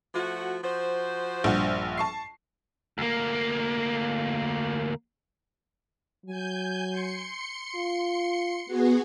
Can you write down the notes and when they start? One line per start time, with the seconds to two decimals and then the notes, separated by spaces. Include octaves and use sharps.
0.14 F3 A3 F#4
0.63 F3 F#4 C5
1.44 A#1 G2 F#5
1.98 A5 C#6 C7
2.98 D2 A#3
6.26 F#3 G#5 G6
6.91 C6 C#7
7.75 F4
8.66 B3 F#4 G#4